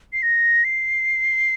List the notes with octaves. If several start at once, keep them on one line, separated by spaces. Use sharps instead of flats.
C7
A#6
C7